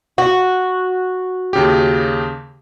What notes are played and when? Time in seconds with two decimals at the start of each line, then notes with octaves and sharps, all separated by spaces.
0.18 F#4
1.53 D#2 C#3 G4